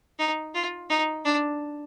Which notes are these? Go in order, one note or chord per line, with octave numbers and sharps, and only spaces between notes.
D#4
F4
D#4
D4